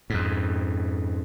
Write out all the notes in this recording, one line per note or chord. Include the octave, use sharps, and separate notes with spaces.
F2 G#2